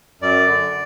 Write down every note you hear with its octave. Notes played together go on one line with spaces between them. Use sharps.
F#2 D5
D3